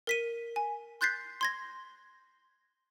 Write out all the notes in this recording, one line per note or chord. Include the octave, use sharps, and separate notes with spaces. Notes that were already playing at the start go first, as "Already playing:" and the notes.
A#4 B6 D#7
G#5
C6 F#6 G6 A6 B6 C7
C6 G#6 A#6